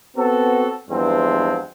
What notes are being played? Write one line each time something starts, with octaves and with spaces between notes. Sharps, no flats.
B3 C4 F#4 A4
E2 G2 F3 G#3 C4